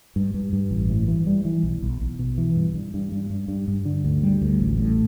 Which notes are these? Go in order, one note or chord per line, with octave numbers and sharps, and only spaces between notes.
G2
G2
G2
A1
A2
E3
G3
E3
B1
B1
B1
B2
E3
G2
G2
G2
G2
G2
G2
G2
D3
D2
G3
D2
A1
A2